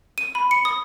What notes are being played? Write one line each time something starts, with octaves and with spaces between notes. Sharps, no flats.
D#7
B5
C#7
D#6